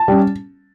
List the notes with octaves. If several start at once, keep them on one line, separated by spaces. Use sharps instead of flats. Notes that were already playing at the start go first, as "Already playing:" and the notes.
Already playing: A5
G3 C#4